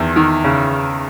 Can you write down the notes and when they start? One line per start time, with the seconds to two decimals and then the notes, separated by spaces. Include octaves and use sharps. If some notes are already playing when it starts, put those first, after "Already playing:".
Already playing: E2 D#3
0.16 D#3
0.44 C#3